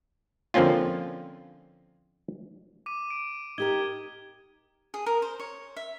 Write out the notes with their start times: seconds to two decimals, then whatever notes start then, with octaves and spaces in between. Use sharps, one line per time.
0.54 D3 F3 A#3 C4 C#4 F4
2.86 D6 D#7
3.11 D7
3.58 D#4 G4 A#4 G#6 G7
4.94 G#4
5.06 A#4
5.22 C5
5.40 C#5
5.77 E5